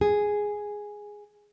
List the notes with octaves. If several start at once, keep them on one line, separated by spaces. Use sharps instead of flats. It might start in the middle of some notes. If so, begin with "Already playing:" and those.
G#4